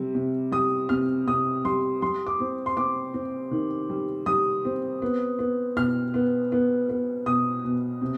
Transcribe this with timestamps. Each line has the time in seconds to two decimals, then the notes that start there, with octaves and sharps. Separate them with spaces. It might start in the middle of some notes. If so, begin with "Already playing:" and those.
Already playing: C3 G3
0.15 C3
0.52 G3 D#6
0.89 C3 F6
1.27 C3 D#6
1.65 G3 C6
2.02 G3 C6
2.26 D6
2.40 C4
2.66 C6
2.77 C4 D6
3.14 C4
3.51 D#3
3.90 G3
4.26 G3 D#6
4.65 C4
5.02 B3
5.39 B3
5.76 B2 F6
6.14 B3
6.52 B3
6.89 B3
7.26 B2 D#6
7.65 B2
8.02 C3